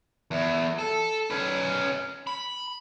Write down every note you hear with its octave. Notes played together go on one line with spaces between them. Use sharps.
E2
A4
C#4 B4
B5